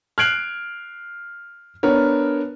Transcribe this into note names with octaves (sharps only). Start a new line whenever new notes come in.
F6 F#6 G#6 C7 D7 F#7
B3 D4 A#4 C#5